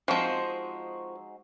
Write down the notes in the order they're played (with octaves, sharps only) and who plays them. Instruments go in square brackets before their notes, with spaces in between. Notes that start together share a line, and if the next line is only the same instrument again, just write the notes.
[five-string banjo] F3 C4 [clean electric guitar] G#3 D#4 F#4